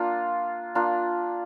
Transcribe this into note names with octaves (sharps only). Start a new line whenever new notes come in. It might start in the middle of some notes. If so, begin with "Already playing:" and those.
Already playing: A#3 D4 F4
A#3 D4 F4